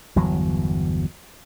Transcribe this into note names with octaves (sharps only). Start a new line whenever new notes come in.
G1 E2 F#3